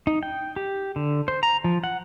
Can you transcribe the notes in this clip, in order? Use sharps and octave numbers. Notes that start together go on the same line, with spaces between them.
D#4
G5
G4
D3
C5
A#5
F3
F#5